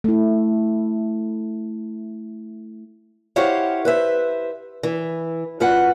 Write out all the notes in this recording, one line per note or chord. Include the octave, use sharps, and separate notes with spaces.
A3 E4
E4 G4 C5 C#5 F5 F#5
B4 C5 E5
E3
F#2 F4 B4 F#5